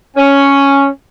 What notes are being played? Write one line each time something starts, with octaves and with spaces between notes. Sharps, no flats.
C#4